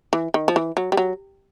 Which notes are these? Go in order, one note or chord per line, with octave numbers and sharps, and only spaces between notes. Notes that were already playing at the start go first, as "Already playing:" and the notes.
E3
D#3
F3
E3
F#3
G3
F#3